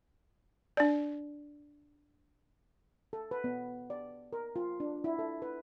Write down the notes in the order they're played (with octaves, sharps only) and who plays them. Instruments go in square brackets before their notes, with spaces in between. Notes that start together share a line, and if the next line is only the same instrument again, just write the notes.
[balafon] D4 D5
[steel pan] A4
B4
B3
D5
A#4
F4
D4
E4
A4
B4